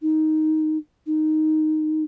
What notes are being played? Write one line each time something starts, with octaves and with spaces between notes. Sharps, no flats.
D#4
D#4